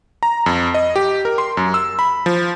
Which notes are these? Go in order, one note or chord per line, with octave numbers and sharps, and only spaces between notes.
A#5
F2
D#5
G4
A#4
C6
F#2
E6
B5
F3